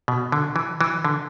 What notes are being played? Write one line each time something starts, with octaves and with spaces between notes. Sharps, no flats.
B2
D3
E3
E3
D3